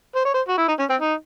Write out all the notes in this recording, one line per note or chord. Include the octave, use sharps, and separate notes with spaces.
C5
C#5
C5
F#4
E4
D#4
C#4
C4
D#4